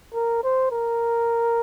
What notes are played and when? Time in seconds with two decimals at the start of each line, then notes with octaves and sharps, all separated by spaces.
0.14 A#4
0.43 C5
0.72 A#4